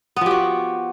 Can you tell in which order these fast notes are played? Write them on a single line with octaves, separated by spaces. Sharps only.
B3 F3 G4 F#4